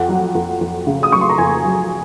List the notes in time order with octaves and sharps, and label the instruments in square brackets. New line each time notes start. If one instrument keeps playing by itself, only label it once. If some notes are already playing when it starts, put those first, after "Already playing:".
Already playing: [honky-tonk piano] F2 F#5
F#3
F2
F2
C#3
D#6
F#3 C#6
C6
A#5
F2 G#5
F#3